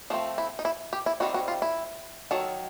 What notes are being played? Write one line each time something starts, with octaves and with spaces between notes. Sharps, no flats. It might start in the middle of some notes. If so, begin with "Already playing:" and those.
F3 A3 C4 D#4
E4
D#4
E4
G4
E4
D#3 G3 C4 F#4
F#4
F4
E4
D#3 F#3 A4